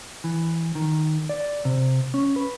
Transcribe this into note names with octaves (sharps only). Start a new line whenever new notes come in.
E3
D#3
D5
C3
C#4
B4